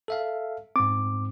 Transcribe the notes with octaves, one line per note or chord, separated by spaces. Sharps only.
A4 E5 F5
G#2 C4 D6